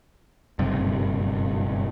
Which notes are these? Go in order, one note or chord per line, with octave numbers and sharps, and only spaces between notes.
F#1 B1 G2 C3